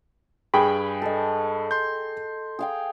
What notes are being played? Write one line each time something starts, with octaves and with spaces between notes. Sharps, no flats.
G2 G#4 G5 B5
A4 D#5
C6 G6
G#4 F5 G5